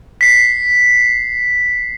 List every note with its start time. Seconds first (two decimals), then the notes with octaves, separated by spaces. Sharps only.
0.21 B6 C7